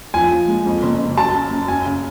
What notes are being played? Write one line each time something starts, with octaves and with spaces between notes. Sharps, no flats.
F3 G#5
F3
G#3
F2
F#1
F#1
F#3 A5
F#2
F#2
F#2 G#5
C#3